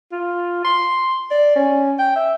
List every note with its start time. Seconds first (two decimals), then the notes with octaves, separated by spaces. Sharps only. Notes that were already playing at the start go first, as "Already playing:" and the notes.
0.12 F4
0.64 C6
1.31 D5
1.56 C#4
1.99 G5
2.16 E5